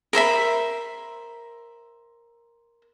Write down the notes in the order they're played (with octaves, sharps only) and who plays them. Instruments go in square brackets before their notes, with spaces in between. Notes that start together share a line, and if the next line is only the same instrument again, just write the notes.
[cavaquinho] A#4 C5 E5 B5